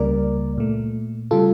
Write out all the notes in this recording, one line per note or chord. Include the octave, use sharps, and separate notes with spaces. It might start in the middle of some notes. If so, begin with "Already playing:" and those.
Already playing: C#2 C#3 G3 A#3 A#4 D5
A#2 A3
C#3 G3 F4 A4